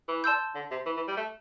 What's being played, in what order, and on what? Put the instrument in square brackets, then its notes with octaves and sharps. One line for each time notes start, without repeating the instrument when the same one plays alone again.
[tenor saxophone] E3
[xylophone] D5 A5 C6 E6 G6
[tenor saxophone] D3
C3
E3
E3
G3
A3